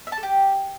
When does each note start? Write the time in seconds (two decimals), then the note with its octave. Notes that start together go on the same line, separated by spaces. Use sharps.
0.07 E5
0.12 A5
0.18 A4
0.23 G4